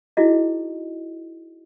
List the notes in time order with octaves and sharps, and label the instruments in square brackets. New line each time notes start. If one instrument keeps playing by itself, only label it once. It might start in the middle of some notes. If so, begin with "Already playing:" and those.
[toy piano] D#4 E4 F#4 G#4 D#5